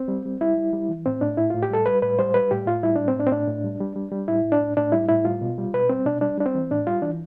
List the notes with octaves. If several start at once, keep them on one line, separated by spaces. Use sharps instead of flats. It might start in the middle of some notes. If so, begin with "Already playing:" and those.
Already playing: C4
G3
G3
G3 E4
G3
G3
E3
A2 C4
A2 D4
A2 E4
A2 F4
G4
G3 A4
G3 B4
A2 B4
G3 C5
G3 B4
A2 G4
A2 F4
G3 E4
A2 D4
C4
A2 D4
C4
A2 D4
A2
G3
G3
G3
G3
A2 E4
A2
D4
A2
A2 D4
G3 E4
A2 E4
G3 F4
B2
G3
B2 B4
G3 C4
B2 D4
G3 D4
G3 D4
C4
E3
A2 D4
G3 F4
E3 D4